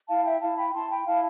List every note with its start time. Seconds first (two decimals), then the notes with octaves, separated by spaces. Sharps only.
0.08 E4 F5 A5
0.24 E5 G5
0.40 E4 F5 A5
0.57 G5 B5
0.73 E4 A5 C6
0.89 G5 B5
1.06 E4 F5 A5